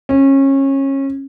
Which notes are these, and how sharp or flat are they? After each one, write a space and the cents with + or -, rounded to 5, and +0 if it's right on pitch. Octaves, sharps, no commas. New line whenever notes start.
C#4 -25